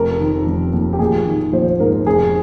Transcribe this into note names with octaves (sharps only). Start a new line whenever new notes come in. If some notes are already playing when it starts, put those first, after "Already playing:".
Already playing: F1 F2 A#4
D#3
F1
D#2
G4
A#1 G#4
D#3
A#1 C5
G#2 A#4
F1 G#4